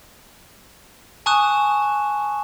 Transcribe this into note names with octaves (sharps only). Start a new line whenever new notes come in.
G#5 A5 C#6 D#6 F#6 E7